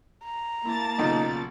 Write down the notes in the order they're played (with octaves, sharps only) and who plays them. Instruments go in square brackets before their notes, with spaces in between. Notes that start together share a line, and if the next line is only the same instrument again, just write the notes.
[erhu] A#5
[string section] A#3 A5 A6 [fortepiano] E4
[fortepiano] B1 A#2 C#3 [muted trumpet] D#4